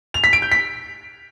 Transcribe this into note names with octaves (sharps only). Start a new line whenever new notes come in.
F7
B6
D7
G6
B6